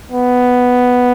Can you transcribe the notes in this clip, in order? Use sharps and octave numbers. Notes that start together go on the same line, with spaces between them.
B3